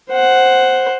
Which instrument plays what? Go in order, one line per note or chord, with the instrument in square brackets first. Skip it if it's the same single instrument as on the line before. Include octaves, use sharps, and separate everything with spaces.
[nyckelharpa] C5 F#5